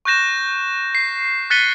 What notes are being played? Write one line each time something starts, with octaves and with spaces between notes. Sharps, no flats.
C#6 F#6 G6 A#6 E7
C7
F#6 A6 B6 C#7 D#7 G7